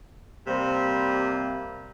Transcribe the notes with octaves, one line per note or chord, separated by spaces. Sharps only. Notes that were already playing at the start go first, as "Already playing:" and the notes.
C3 G3 A#3 C5